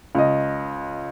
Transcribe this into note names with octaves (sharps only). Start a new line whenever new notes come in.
C#2 D#5